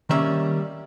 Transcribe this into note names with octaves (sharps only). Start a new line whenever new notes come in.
D#3 G3 A#3 C#4 E5